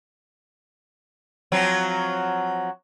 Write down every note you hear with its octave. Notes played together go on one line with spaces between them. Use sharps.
F3 F#3 C4